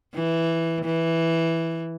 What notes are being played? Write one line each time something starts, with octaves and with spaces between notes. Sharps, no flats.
E3
E3